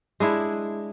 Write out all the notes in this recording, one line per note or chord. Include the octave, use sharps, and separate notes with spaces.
G#3 D4 E4